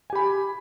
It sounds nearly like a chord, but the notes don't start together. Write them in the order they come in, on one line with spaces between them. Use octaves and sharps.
G#5 G4 B5